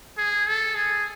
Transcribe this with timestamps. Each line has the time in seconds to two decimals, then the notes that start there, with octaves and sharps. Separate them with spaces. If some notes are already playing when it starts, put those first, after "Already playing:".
0.18 G#4
0.47 A4
0.75 G#4